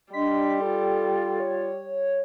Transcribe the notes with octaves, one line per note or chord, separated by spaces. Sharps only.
G3 D4 D#5 C6 B6
F4 A4
C#5